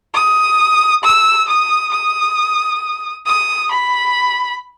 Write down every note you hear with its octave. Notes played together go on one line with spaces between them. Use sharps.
D#6
E6
D#6
D#6
D#6
B5